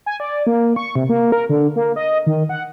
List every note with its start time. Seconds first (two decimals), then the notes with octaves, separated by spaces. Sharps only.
0.06 G#5
0.20 D5
0.47 A#3
0.76 C#6
0.96 C3
1.09 A#3
1.32 A#4
1.49 D3
1.76 A#3
1.96 D#5
2.27 D#3
2.49 F#5